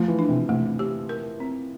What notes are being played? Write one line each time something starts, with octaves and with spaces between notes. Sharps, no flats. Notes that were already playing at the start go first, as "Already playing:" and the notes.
Already playing: F3 A3
E3
D4
C3
C3 A3
G4
A#4
C4